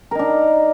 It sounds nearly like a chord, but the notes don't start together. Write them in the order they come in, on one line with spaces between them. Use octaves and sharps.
A#4 D#4 D4